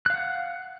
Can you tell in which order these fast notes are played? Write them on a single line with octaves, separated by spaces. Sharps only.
F#6 F5 F#5